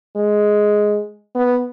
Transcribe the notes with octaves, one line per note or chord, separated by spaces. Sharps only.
G#3
B3